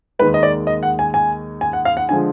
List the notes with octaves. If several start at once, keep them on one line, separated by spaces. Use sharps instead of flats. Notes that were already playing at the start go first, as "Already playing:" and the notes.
D#2 D#3 G#3 B4
D#5
D5
D#5
F#5
G#5
G#5
G#5
F#5
F5
F#5
D3 F3 G#3 G#5